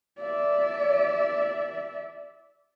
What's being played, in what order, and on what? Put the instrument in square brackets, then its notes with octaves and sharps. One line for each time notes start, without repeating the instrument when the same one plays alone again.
[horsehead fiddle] D5 E5